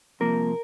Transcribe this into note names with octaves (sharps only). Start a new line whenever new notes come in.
C2 C3 F3 A#3 A#4